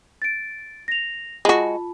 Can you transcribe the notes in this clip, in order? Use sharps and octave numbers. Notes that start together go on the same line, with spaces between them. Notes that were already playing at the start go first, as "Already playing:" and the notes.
A6 D7
A#6 F7
G#3 F4 F#4 A5 B5